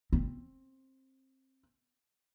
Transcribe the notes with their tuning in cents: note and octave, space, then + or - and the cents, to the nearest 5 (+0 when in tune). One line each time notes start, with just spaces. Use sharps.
C4 +20